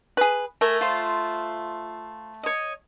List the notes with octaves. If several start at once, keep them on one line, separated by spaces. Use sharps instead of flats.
G#4 B4
A3 A#4 E5 G#5
F4 C5 C6
C#5 D#5